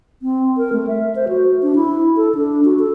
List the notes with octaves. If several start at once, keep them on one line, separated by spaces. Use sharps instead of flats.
C4
A#4
A3
E5
C5
F#4
D4
E4
A4
D4
F#4
A4